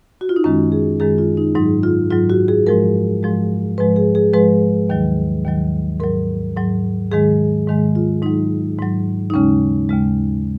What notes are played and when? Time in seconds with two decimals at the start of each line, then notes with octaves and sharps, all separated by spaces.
0.21 F#4
0.29 F4
0.36 D#4
0.44 F#2 D#3 G#3 C#4
0.72 G#4
1.00 F#2 D#3 G#3 G#4
1.18 F4
1.37 D#4
1.55 G#2 F#3 D#4
1.83 F4
2.11 G#2 F#3 F4
2.30 F#4
2.48 G#4
2.67 G#2 F3 G#3 A#4
3.23 G#2 F3 G#3
3.78 G#2 F3 G#3 B4
3.96 G#4
4.15 G#4
4.33 G#2 F3 G#3 B4
4.89 D#2 D#3 F#3
5.45 D#2 D#3 F#3
6.00 G#2 F#3 A#4
6.57 G#2 F#3
7.12 G#2 D#3 G#3 G#4
7.68 G#2 D#3 G#3
7.95 F4
8.23 G#2 F#3 D#4
8.78 G#2 F#3
9.30 D#4
9.34 D#2 C#3 G#3 C#4
9.89 D#2 C#3 G#3